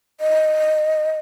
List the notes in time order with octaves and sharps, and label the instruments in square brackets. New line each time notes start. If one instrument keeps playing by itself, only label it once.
[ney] D#5